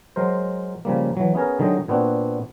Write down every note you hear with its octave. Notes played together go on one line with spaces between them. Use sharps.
F#3 G#3 A#4 C5
C#3 F3 G3 A#3
E3 F#3
B3 C#4 G#4 A#4
D3 D#3 F#3 G#3 D#5 G5
A#2 B3 C4 D4 F#4